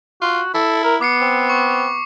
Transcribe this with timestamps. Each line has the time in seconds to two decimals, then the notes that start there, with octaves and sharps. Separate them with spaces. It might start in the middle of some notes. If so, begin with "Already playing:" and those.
0.22 F4 F#4
0.54 E4 A4
0.84 A#4
1.01 B3 D6 C7 C#7
1.21 C4
1.49 C#6